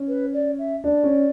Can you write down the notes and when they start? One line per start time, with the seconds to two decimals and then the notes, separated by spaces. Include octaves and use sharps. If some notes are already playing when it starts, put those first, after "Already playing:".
Already playing: C#4
0.08 B4
0.33 D5
0.59 E5
0.84 D4 D5
1.03 C#4